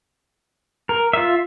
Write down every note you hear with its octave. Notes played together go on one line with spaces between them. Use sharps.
A#4
F4 E5